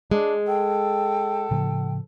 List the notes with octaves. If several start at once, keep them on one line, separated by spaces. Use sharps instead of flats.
G#3 D4
A4 G5
A2 C#3 F3